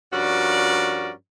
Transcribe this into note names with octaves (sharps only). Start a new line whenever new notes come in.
G2 F3 C#4 F#4 A#4 D5